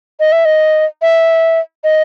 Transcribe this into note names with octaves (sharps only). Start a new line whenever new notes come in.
D#5
E5
D#5
E5
D#5